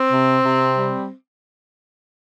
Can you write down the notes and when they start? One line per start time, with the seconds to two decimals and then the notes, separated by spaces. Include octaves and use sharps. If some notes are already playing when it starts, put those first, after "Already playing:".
Already playing: C4
0.11 C3
0.44 C3
0.76 G3